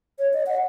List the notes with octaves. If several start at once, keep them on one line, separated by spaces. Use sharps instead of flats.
C#5
D#5
F#5